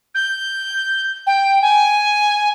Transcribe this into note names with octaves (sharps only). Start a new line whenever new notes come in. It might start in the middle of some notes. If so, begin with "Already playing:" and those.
G6
G5
G#5